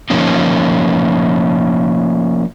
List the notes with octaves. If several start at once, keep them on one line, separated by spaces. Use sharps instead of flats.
F3 A#3 C#4 D#4